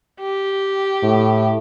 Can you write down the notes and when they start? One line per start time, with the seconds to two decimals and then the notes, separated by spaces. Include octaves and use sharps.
0.22 G4
1.03 A2